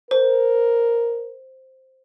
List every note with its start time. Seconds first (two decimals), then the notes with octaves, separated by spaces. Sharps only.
0.11 A#4 C5